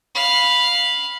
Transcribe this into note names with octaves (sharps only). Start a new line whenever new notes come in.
F5 B5